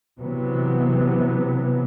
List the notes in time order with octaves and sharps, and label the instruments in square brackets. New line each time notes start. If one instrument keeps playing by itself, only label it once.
[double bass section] C3 E3 F#3 B3